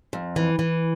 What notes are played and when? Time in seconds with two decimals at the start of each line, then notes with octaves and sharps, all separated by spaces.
0.13 F2
0.36 E3
0.59 E3